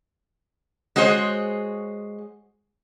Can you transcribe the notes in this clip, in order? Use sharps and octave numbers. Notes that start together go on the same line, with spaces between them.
G#3 F#4 G#4 C5 C#5